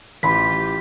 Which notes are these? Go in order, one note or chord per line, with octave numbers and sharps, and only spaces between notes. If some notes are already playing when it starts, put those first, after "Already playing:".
A1 F4 G4 B5 C6 B6